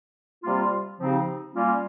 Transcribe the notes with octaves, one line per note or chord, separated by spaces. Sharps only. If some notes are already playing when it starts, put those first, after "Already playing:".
C3 G3 A#3 F4
C#3 F3 C4 D#4 G4
G3 A#3 C#4 F4